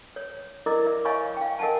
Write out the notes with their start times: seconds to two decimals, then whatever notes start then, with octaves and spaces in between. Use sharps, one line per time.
0.16 C#5
0.66 E4 A#4 D5 D#5 D6
0.87 E5
1.05 C#5 D#5 F5 G#5 B5 C#6
1.37 F5 G5
1.59 A#4 D#5 F#5 G#5 A5